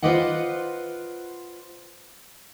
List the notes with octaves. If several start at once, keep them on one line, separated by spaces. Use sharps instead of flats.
F4 B4 C5 D5 D#5 F#5